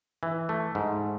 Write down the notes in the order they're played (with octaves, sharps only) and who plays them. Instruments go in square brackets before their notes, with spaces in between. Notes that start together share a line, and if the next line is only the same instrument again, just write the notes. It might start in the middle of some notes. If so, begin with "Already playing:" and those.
[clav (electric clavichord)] E3
A3
G#2